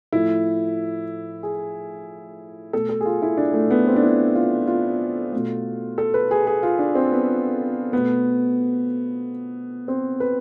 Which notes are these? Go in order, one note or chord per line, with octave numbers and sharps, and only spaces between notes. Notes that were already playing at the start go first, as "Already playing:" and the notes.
A2 F3 A3 E4
G#4
B2 A3 A4
A4
G#4
F4
E4
D4
A3
B3
C4
D4
E4
F4
F4
B2 A3
A4
B4
G#4
G#4
F4
D4
C4
B3
B2 A3 B3
C4
B4